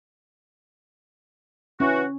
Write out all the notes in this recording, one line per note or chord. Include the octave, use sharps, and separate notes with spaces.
E3 C#4 F#4